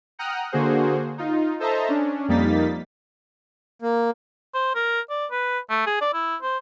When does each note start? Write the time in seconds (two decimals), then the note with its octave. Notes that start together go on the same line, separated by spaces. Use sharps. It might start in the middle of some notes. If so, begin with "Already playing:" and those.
0.19 F#5 G5 A#5 D#6 F6 F#6
0.52 D3 A#3 F#4 G#4 C5
1.18 D#4 F4
1.60 A4 C5 D#5 E5 A5 A#5
1.89 C#4 D4
2.28 F2 G3 A#3 D#4 A6 B6
3.82 A#3
4.54 C5
4.75 A#4
5.10 D5
5.31 B4
5.70 A3
5.86 G#4
6.01 D5
6.14 E4
6.42 C5